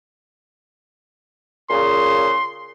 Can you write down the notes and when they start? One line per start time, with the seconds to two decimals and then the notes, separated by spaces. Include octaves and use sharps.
1.70 A#2 C#3 C6